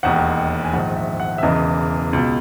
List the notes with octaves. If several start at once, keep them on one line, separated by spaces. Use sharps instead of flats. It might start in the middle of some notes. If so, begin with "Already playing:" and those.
E1 D#2 D#3 F#5
G#5
A#1 G#2 D#3 F#5
E5
F#5
E5
E1 E2 C#3 E3 D#5
C#2 B2